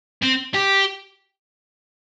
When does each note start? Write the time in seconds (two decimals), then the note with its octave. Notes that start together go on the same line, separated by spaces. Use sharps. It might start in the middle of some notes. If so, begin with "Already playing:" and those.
0.22 C4
0.54 G4